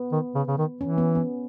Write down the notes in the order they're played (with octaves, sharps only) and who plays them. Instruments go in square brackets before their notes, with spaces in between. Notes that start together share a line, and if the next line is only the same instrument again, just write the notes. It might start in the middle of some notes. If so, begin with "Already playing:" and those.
Already playing: [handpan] B3
[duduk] D#3
C#3
C#3
D#3
[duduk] E3 [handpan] C#4
[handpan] B3
B3